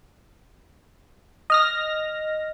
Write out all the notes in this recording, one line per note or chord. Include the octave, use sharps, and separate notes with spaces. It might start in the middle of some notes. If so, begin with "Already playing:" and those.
D#5 F6 A#6